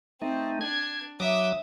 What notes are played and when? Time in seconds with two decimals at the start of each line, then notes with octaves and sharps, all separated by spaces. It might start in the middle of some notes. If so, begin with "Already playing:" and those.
0.22 A3 C4 D#4
0.61 D4 G#6
1.20 F#3 E5 D6 D#6